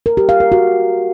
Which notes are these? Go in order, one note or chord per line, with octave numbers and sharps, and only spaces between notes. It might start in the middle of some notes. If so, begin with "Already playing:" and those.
A#4
G4
F5
A#4
F#4